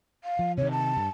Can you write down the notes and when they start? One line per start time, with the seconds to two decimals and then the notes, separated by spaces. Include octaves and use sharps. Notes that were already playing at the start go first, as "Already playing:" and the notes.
0.24 F5
0.39 F3
0.58 C3 D#3 C#5
0.71 A5
0.97 G2